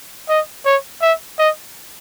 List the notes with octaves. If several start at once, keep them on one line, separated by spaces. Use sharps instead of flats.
D#5
C#5
E5
D#5